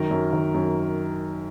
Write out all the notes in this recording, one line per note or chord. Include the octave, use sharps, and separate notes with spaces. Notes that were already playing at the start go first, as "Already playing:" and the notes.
Already playing: F#2 D#3 A#4
F#2
D#3
F#2